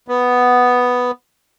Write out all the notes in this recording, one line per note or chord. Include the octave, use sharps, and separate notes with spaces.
B3